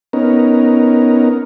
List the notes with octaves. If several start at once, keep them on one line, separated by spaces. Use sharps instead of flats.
B3 C#4 D#4 A#4